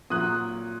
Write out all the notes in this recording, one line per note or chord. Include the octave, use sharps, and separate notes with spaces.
A#2 F#3 D#6 F#6